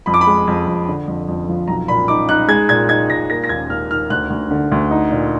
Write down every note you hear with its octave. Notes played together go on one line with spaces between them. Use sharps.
F2 B5
D6
B5
G#3
F2
F2
D3
F2
F2
F3
B1 A#5
A#2 B5
D#4 D6
D#4 F#6
G#3 G#6
A#2 G#6
D#4 G#6
A#2 A#6
A#3 A#6
A#6
D#2 G#6
D#2 F6
D#3 F6
D2 F#6
D2
D3
D2
D#4
A#2